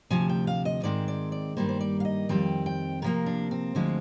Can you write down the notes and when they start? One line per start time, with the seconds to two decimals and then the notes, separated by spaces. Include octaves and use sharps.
0.10 D2 C3 F3 G#5
0.29 G5
0.47 F5
0.65 D#5
0.83 G#2 D#3 G#3 C4 D5
1.08 D5
1.32 D5
1.57 G2 D#3 G3 A#3 C5
1.69 C5
1.80 D5
2.00 F5
2.05 D#5
2.29 F2 D#3 G3 C4 G5
2.66 G5
3.02 C3 F3 A#3 A#4
3.26 D4
3.51 C4
3.75 D2 D3 F3 G#3